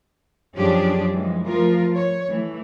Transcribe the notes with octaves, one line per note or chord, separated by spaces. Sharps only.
F#2 F3 C#4 D4 G4 G#4
E3 F3 G#3
F3 A3 F4 A#4
C#5
E3 A3